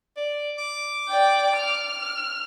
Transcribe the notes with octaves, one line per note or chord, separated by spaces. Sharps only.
D5
D6
D5 G5
F6